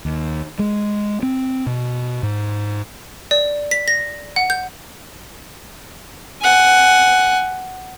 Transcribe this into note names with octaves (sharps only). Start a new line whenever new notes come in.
D#2
G#3
C4
B2
G#2
D5
B6
A#6
F#5
G6
F#5 G#5